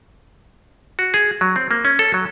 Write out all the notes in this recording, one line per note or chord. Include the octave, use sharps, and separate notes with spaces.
F#4
G#4
F#3
C4
A#3
C#4
A4
F#3